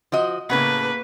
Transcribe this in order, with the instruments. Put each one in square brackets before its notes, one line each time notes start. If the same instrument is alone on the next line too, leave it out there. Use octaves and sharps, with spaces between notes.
[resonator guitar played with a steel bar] F3 F#4 D#5
[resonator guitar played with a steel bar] A2 C#3 B3 [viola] A#3 B4